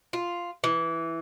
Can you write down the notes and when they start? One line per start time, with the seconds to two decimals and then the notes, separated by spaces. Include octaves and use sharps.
0.13 F4
0.64 E3